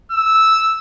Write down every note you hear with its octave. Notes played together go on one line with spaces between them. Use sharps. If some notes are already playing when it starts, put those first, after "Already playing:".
E6